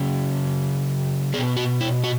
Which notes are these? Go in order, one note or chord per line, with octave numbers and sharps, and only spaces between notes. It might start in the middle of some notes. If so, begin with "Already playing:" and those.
Already playing: C#3 F#3 C#4
B2 B3 G#4
F#4
E4
F#4